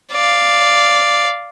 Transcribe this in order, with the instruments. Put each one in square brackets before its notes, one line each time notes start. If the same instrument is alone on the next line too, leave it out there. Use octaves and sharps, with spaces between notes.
[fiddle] D5 F5